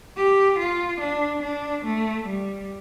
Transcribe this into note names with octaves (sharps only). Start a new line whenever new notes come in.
G4
F4
D4
D4
A3
G3